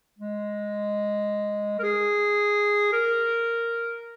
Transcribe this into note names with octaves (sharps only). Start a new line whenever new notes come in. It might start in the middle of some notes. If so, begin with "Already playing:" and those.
G#3
A#4
G#4
A#4